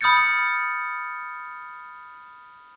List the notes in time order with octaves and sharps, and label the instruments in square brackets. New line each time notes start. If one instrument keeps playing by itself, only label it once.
[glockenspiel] B5 D#6 F6 G6 A6 C#7